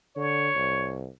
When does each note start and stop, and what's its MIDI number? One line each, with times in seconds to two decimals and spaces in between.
0.16 0.49 50
0.16 0.97 73
0.55 1.07 36